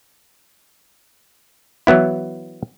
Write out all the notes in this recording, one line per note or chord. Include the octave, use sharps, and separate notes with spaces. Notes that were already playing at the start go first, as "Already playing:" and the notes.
E3 F#3 B3 E4